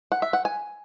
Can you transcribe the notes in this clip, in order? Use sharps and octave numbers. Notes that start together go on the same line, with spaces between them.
F#5
E5
F#5
G#5